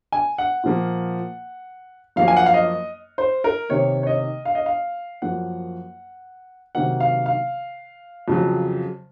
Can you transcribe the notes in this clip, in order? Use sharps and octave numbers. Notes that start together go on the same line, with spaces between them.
G#5
F#5
A#2 F3 A#3
F#2 F3 A#3 F5
G#5
F#5
F5
D#5
C5
A#4
C3 D#3 A#3 C#5
C#5
D#5
F5
D#5
F5
F#2 F3 A#3 F#5
C3 D#3 F#3 A#3 F#5
F5
F5
F2 C#3 F#3